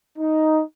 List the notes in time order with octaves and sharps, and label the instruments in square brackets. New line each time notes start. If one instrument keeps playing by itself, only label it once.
[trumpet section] D#4